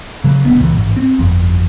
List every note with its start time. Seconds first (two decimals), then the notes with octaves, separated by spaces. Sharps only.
0.24 C#3 F#3
0.45 D#1 D2 B3
0.58 C#2 A#2 E3
0.75 A1 G#2
0.96 C4
1.19 G1 F2